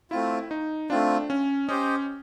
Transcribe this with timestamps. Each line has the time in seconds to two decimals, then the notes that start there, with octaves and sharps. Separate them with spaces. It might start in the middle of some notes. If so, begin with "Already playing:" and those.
0.11 A3 C4 E4 F4
0.51 D#4
0.90 A3 C4 D4 F4
1.30 C#4
1.68 C#4 G4 C5 D#5